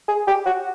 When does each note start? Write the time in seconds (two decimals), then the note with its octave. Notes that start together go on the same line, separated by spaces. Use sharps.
0.08 G#4
0.27 G4
0.46 F#4